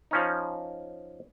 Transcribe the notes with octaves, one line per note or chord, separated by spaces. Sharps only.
F3 C#4 D#4